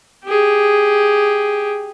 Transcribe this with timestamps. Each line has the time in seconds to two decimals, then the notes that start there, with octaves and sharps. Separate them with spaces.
0.24 G4 G#4